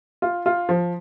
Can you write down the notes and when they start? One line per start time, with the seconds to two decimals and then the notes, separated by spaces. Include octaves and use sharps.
0.22 F4
0.46 F4
0.69 F3